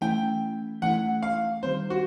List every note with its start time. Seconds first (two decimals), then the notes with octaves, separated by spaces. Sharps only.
0.01 E3 A3 C#4 E4 G5
0.82 E3 A3 C#4 E4 F#5
1.23 F5
1.63 D#3 G3 C4 C5
1.90 F#4